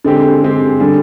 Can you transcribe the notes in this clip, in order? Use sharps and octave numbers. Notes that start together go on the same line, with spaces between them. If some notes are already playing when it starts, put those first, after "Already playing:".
D3 G#3 C4 G4
D3 G#3 C4 G4
D3 G3 D4 G#4